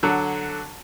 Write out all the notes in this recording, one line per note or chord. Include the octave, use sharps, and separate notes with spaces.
D3 F#3